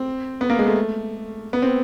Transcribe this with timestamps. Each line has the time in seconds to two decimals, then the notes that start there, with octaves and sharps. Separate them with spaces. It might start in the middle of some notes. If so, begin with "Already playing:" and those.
Already playing: C4
0.41 B3
0.50 A#3
0.59 G#3
0.67 A3
1.53 B3
1.62 C4